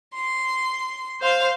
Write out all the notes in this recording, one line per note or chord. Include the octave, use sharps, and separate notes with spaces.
C6
C5 F5 C6